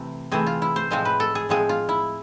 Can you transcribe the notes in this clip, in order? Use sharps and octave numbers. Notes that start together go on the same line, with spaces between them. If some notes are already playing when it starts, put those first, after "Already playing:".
Already playing: C3 E3 A3 C4
C3 E3 A3 C4 G#4
F4
E4
C5
A2 F3 G#3 C4 C5
B4
A4
G#4
A2 F3 G#3 C4 G#4
F4
E4